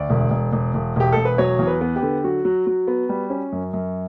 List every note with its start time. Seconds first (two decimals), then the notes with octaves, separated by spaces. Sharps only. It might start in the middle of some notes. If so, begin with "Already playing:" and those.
Already playing: D2 D5
0.10 E1
0.31 E1
0.52 E1
0.74 E1
0.96 E1 G4
1.12 E1 A4
1.25 B4
1.38 F#3 C#5
1.59 E2
1.67 B4
1.81 B3
1.96 G4
2.02 D3
2.24 F#3 F#4
2.45 F#3
2.67 F#3
2.87 B3
3.09 G3
3.30 C#4
3.52 F#2
3.73 F#2